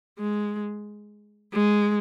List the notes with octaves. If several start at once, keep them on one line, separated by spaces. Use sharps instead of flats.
G#3
G#3